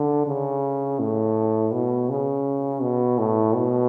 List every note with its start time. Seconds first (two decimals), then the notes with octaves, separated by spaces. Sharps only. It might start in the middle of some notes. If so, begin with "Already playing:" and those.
Already playing: D3
0.27 C#3
0.99 A2
1.73 B2
2.10 C#3
2.82 B2
3.19 A2
3.55 B2